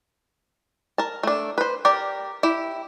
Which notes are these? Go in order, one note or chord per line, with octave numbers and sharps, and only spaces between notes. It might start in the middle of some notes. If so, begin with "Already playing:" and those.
A#4 A5
A3 D4
B4 C5
G4 A#4 D5 G5
E4 G4